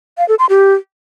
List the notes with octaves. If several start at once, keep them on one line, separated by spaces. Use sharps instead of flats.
F5
A4
C6
G4